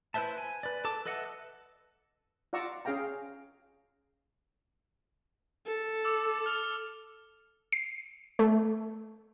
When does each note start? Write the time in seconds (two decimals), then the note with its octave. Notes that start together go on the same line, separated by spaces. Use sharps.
0.14 E4 B4 C5 E5 A5
0.38 G#5
0.63 B4 D5
0.85 A4 A5 D6
1.06 A4 B4 D#5 E5 F#5
2.53 F4 D5 F#5 A#5 C#6 E6
2.85 C#4 G#4 F5 G5 A#5
5.66 A4
6.05 D6 E6
6.46 F6 F7
7.72 C7
8.39 A3